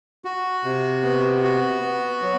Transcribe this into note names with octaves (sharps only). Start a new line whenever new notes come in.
F#4
C3
B3
F#4
B3
F#3